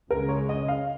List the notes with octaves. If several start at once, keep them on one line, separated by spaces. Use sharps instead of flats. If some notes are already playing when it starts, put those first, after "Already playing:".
C#2 C#3 G#3 A#4
C#5
D#5
F5